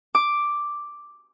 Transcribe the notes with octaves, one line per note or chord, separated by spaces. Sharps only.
D6